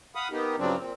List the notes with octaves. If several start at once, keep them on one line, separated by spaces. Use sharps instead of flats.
F5 F#5 B5 D#6
A#3 B3 D#4 G4
G2 C#3 F3 F#3 C4 D4
A#2 C4